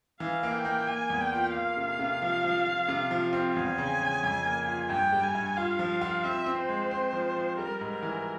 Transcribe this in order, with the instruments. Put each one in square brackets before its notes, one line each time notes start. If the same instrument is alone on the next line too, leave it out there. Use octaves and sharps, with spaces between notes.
[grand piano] E3 [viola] F5
[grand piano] A#3
[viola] G5
[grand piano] A#3
[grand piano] A#3 [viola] G#5
[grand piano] E2
[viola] G5
[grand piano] F4
[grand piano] A#3 [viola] F5
[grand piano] C3
C3
F3
F3
F3
C3
F3
C4
[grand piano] E2 [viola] G#5
[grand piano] C#3
C#3
F2
A#3
F4
[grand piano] G2 [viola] G5
[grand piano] G3
[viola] G#5
[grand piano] G2
[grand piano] F4 [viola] F5
[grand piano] F3
F4
[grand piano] C4 [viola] E5
[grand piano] C4
[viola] C5
[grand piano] G#3
C4
F3
F3
[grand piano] G3 [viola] A#4
[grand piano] G#2
[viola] A#4
[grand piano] E3